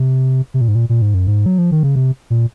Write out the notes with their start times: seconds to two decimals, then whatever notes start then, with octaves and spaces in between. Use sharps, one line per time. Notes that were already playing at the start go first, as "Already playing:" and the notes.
Already playing: C3
0.54 C3
0.61 A#2
0.68 G#2
0.75 A#2
0.89 A#2
1.02 G#2
1.14 F#2
1.27 G#2
1.46 F#3
1.58 F3
1.72 D#3
1.83 C#3
1.96 C3
2.30 A#2